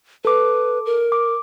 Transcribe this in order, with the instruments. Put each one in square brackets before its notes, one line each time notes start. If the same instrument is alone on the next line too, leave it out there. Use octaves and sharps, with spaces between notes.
[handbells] A4 D6 [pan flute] B4
[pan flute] A#4
[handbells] D6